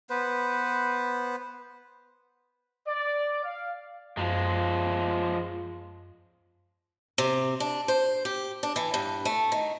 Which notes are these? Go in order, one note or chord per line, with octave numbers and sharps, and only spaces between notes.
B3 B4 C5
D5
F5
F#2 F3 G#3
C3
D4
C5
G4
D4
E3
G2
A3
D#3